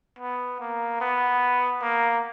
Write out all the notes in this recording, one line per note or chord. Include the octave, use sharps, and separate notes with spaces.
B3
A#3
B3
A#3